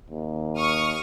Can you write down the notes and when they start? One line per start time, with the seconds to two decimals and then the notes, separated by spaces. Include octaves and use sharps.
0.10 D#2
0.59 C#6 D#6 F6